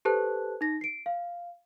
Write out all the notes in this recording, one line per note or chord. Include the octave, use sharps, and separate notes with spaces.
G4 A4 B4 C5 A5 F#6
D#4 A#6
C7 D7
F5